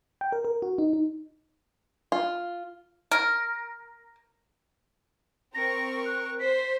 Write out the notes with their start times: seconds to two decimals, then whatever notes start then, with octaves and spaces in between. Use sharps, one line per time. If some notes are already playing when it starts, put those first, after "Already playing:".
0.21 G5
0.32 A#4
0.45 A#4
0.62 F#4
0.78 D#4
0.93 D#4
2.12 F4
3.11 A#4
5.54 C4 A#4 C#6 A#6
6.05 F#6
6.39 C5 B6